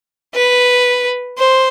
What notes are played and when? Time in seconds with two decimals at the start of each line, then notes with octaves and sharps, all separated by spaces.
0.34 B4
1.38 C5